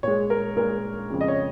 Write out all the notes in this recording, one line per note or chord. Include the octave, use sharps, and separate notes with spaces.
A#2 G#3 C#5
A#4
A#2 G#3 A#4
F2 C#3 G#3
D#5
C#5